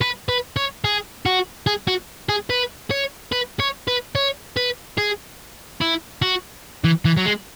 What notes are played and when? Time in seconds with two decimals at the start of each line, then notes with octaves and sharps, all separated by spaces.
0.02 B4
0.29 B4
0.56 C#5
0.84 G#4
1.25 F#4
1.67 G#4
1.88 F#4
2.29 G#4
2.50 B4
2.91 C#5
3.32 B4
3.60 C#5
3.88 B4
4.15 C#5
4.56 B4
4.98 G#4
5.81 E4
6.22 F#4
6.84 E3
7.05 E3
7.17 F#3
7.26 G#3